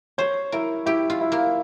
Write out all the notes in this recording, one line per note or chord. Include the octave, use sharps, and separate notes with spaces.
C5 C#5
E4 A#4
E4 G4
F4
E4
A#3